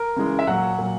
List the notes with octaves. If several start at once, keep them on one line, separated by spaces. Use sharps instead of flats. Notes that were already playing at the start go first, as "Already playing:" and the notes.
Already playing: A#4
C#3 E3 G#3
E5
A#2 F#3 F#5
A#2 F#3